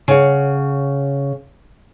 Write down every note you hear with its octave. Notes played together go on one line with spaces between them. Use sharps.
C#3 F#5